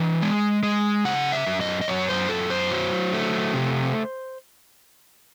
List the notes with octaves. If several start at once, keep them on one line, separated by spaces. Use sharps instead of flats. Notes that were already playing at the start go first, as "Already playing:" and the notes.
Already playing: E3 D#5
G#3
G#3
C#3 F#5
E5
F#2
D#5
D#5
F#2 C#5
C5
F#2 A4
C5
F#3
A3
C3